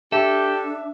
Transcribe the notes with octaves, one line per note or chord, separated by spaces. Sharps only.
D4 G4 A4 E5